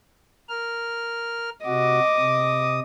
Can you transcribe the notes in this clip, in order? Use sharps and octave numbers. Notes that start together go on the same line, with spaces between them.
A#4 F6
C3 F#4 D#5 D6
C3 D#6